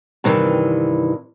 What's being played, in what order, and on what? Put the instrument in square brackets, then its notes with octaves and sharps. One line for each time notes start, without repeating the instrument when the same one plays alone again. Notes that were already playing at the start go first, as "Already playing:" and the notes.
[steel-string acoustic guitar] G2 C3 D#3 E3